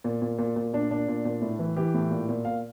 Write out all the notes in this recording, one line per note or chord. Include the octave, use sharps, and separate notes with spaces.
A#2
A#2
A#2
A#2
A#2 D4
A#2 D4
A#2
A#2
A2
E3
E3 G4
A2
A#2
A#2
A#2 F5